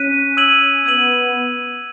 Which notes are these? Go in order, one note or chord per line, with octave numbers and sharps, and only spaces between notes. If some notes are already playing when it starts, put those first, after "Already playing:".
Already playing: C#4 F#6 B6 D#7
E6 G#6 D#7 F#7
B3 E6 G#6 D#7 F#7